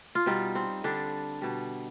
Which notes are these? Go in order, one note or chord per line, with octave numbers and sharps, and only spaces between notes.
F4
B2 G3 D#4
C4
D3 G3 D4
B2 G3